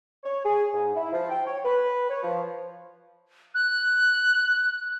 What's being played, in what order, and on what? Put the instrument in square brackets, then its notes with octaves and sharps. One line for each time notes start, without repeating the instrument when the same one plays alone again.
[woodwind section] C#5
G#4
G#2
E4
F3
G5
C#5
B4
C#5
F3
[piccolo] F#6